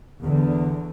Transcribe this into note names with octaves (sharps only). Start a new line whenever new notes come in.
E2 D3